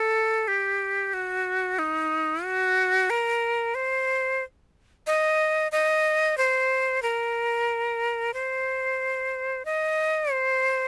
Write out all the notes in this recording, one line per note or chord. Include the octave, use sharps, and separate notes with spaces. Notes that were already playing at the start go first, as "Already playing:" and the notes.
Already playing: A4
G4
F#4
D#4
F#4
A#4
C5
D#5
D#5
C5
A#4
C5
D#5
C5